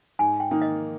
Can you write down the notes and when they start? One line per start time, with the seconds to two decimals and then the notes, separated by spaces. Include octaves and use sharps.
0.19 G#2 G#5
0.40 G5
0.51 D#3 A#3 D#4
0.62 D#5